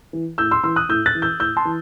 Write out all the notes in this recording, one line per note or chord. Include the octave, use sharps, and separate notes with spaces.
E3
A2 E6 G6
C6 E6
E3 C6 E6
D#6 F#6
A2 E6 G6
F#6 A6
E3
E6 G6
A2 E6 G6
A5 C6
E3